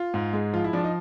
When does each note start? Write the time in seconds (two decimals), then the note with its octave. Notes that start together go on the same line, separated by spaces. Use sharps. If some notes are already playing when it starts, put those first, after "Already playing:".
Already playing: F4
0.14 G#2
0.33 G#3
0.53 F3 F4
0.64 E4
0.73 F3 D4
0.84 D#4